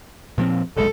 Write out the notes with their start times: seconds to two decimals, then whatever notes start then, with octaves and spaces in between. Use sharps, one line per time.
0.38 A#2 F3 C4
0.77 F1 B1 G#3 A4